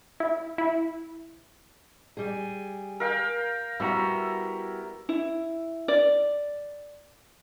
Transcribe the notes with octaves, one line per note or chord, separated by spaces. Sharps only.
E4
E4
G3 G#4
A#4 F5 G5
G3 B3 E4 F#4 A#5
E4
D5